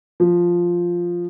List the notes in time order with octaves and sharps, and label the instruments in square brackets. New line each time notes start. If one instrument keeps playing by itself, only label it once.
[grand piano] F3